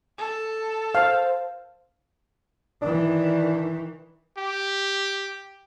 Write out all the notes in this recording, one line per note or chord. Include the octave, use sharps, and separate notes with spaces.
A4
C5 F5
D#3 E3 D4
G4